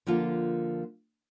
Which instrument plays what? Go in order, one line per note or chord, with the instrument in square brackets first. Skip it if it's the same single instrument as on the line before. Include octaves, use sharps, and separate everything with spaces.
[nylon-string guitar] D3 F3 A#3 F4